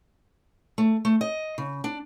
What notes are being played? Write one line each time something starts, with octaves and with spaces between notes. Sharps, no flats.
A3
A3
D#5
C#3
D4